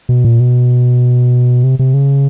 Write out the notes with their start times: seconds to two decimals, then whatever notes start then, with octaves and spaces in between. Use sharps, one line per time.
0.09 B2
0.25 A#2
0.40 B2
1.64 C3
1.79 C3
1.94 C#3